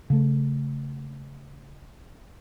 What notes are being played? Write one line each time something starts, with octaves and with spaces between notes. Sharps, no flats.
C#3 A3